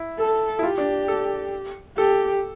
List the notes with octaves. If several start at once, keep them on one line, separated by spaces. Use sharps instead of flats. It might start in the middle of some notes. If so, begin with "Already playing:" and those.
Already playing: E4
A4
E4
F4 G4
D4
A4
G4 A4